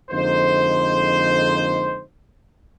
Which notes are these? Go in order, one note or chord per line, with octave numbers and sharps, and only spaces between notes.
F2 D3 G#3 A#3 D#4 C5